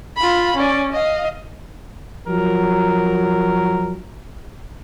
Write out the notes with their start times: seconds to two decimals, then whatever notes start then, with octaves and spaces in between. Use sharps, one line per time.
0.17 F4 B5
0.56 C#4 D5
0.93 D#5 F5
2.28 F3 F#3 A#4